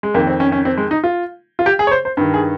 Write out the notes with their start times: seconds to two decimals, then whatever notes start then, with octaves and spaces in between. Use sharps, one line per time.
0.03 G#3
0.14 F2 D#3 A#3
0.27 C4
0.40 C#4
0.52 C#4
0.65 C4
0.77 G#3
0.91 D#4
1.04 F4
1.59 F4
1.66 G4
1.79 G#4
1.87 C#5
1.91 C5
2.05 C5
2.17 G2 D#3
2.34 G#4